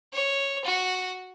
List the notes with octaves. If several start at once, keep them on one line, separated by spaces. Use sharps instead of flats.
C#5
F#4